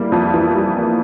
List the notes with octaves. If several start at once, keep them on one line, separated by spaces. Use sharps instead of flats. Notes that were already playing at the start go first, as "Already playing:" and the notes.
Already playing: E3 G3 A#3
F2
E3
G3
A#3